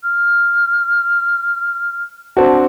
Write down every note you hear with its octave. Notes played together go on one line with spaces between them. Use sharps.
F6
C4 D4 F#4 A5